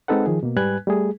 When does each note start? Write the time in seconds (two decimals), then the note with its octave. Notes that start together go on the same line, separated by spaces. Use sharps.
0.08 G#3 C4 D#4 A4 B4 F#5
0.26 D#3 F3 G#4
0.43 B2 A#3
0.56 G#2 G3 B4 G#5 F#6 G#6
0.87 G3 A3 G#4